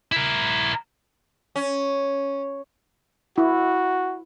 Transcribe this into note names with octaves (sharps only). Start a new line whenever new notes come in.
E4 A#4
C#4
E4 F#4